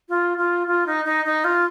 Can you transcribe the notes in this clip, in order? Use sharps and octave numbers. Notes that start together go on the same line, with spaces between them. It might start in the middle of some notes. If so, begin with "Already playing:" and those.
F4
F4
F4
D#4
D#4
D#4
F4